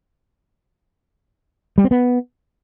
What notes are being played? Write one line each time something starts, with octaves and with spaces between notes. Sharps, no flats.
G3
C4
B3